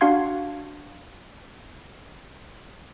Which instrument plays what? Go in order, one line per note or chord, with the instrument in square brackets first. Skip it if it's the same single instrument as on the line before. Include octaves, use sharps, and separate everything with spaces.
[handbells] D4 F#4 F5 F#5 C6 G#6